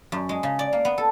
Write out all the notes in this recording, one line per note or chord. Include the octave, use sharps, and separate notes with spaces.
F#2
G#3
C#3
D5
A#3
B3
A4